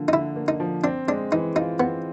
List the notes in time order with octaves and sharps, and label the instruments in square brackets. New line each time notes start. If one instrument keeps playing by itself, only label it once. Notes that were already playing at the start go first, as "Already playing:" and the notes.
Already playing: [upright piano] D3 F3 A#3
[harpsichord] D#4
[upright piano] D3 [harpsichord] E4
[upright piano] A#3
[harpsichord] D#4
[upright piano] F3
[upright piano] C4 [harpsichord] D4
[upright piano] G#3 [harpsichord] D4
[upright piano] E3 [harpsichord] D#4
[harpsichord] D#4 [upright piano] F4
[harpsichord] B3 [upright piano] C4